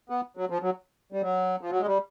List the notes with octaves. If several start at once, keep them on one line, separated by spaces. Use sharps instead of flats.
B3
F#3
F3
F#3
G3
F#3
F3
F#3
G#3
G3